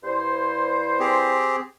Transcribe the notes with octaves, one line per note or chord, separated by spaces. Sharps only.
G2 E4 C5
C4 G4 G#4